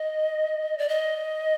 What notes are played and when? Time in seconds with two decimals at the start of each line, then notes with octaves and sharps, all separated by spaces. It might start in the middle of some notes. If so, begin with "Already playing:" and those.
Already playing: D#5
0.78 D5
0.89 D#5